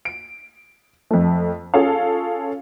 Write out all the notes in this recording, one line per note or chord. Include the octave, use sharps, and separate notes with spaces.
D7
F2 A3
C#4 F4 G#4 A4 C#5 F5